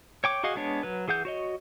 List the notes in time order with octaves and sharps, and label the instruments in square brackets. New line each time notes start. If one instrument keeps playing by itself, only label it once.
[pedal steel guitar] C#5 G5 D6
F#4 G#4 D#5 F5 F#5
G#3 B3 D4 C#5
F#3 B4
E3 G#4 F#5 G6
F#4 C#5 D#5